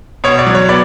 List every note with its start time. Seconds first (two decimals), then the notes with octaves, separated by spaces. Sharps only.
0.24 B2 C#5
0.39 D5
0.47 F#3
0.55 C#5
0.69 B3 D5